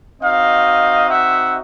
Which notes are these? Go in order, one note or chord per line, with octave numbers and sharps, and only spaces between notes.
C4 D#4 F#4 D#5 F5
E5 F#5